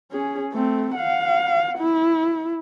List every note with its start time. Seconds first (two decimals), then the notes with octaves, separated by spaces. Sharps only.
0.11 C#4 G#4
0.53 A3 C4
0.95 F5 F#5
1.78 E4